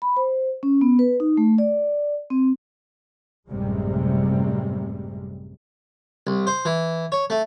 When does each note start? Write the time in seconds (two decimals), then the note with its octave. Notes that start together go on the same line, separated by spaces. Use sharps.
0.02 B5
0.17 C5
0.63 C#4
0.81 B3
0.99 B4
1.20 D#4
1.37 A3
1.58 D5
2.30 C4
3.49 A1 F#2 C3 G3 G#3
6.27 C2
6.47 C5
6.65 E3
7.12 C#5
7.30 A3